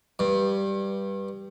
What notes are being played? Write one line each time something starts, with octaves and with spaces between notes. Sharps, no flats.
G2